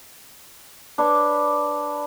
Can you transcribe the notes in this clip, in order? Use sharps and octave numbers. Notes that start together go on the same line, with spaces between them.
D4 B4 C#5 D6